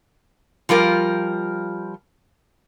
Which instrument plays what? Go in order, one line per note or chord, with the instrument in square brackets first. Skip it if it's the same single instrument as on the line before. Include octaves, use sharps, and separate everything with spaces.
[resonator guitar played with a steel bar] F3 G3 F4 A#4